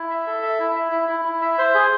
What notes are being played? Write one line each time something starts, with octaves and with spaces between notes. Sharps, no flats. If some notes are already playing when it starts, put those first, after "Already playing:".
Already playing: E4
E5
A4
E5
E4
E5
E4
E4
E4
E5
C5
G#4